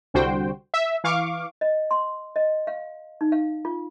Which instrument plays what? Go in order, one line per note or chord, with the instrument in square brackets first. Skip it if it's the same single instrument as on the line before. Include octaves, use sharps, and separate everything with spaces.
[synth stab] C2 D3 G3 F#4 C5 G5
E5
E3 F5 C#6 D6
[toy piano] D#5
C6
D#5
F5
D#4
F5
F4